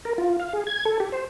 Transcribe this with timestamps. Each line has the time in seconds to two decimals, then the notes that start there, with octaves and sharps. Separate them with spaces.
0.05 A#4
0.18 F4
0.40 F5
0.53 G#4
0.67 G#6
0.85 A4
1.00 G4
1.12 C5